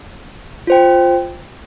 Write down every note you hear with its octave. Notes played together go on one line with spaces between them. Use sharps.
F4 C5 G5